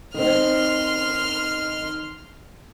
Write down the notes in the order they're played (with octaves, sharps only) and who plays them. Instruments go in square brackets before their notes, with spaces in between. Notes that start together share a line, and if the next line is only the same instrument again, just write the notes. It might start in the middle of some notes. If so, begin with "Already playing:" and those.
[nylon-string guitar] D#3 C4 [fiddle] C6 F6